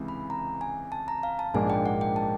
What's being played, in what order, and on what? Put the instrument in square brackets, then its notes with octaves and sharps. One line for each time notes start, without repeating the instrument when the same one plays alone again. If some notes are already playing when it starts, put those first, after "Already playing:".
Already playing: [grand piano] C#2 C3 E3
[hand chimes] B5
A#5
G#5
A5
A#5
F5
A5
[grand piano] A#1 G#2 F3 A#3 D4 [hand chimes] G#5
[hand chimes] G5
F#5
G5
A5